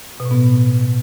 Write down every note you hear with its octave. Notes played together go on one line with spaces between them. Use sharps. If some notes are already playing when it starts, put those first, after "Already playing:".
B2
A2
B3